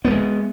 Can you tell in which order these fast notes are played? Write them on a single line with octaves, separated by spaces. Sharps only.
B3 A3 G#3